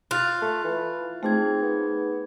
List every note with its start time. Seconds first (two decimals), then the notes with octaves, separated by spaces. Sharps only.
0.11 F4 F#6 A6
0.42 A3
0.64 E3
1.23 A3 C4 D#4 G#4 G#6
1.62 B3